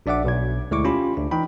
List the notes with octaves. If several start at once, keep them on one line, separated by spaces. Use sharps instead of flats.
A#1 D4 D5 E5 F#5 D6
B1 B2 G#6
D2 G#3 E4 C#6 D6
C#4 F4 G4 B5
D2 D4
E3 D#4 G5 B5